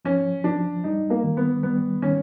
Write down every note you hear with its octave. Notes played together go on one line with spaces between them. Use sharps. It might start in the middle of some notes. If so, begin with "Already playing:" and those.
F3 C#4
F3 D4
G3 D#4
A#3
D#3
B3
G3 B3
D#3 C#4